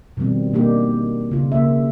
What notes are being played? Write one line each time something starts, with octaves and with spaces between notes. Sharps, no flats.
B2 D#3 F3 G3 C4
B2 A#3 D4 D#4 G4
C#3 F4
C#3 A#3 E5